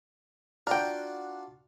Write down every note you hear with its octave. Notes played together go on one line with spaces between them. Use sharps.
D4 F4 F#4 A#4 G5